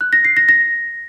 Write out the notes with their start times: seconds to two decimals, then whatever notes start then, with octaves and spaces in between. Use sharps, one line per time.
0.01 F#6
0.13 A#6
0.25 C7
0.37 A#6
0.49 A#6